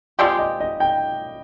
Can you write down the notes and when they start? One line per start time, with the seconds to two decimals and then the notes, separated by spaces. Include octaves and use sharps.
0.19 F3 G#3 C4 G4 D5
0.39 D#5
0.60 D#5
0.80 G5